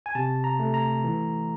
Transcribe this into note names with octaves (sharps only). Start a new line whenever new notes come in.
G#5
C3 A5
A#5
A3
A#5
E3